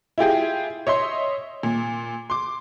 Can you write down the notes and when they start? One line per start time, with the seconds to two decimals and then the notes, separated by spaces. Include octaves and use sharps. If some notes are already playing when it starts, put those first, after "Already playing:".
0.18 E4 F4 G4 G#4
0.87 C#5 D#5 E5 C6
1.63 A#2
2.30 C6 D6